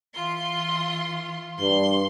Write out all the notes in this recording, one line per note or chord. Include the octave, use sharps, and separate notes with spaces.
E3 F4 C6
G2 C6